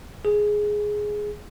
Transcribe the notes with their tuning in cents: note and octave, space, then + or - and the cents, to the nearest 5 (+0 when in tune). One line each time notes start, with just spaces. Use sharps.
G#4 +5